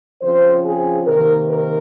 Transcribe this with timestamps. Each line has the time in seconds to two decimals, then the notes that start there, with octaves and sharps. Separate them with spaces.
0.22 C#3 F3 C4 C5
0.64 G#4
1.06 C3 D#3 A#3 D#4 A#4
1.50 A#4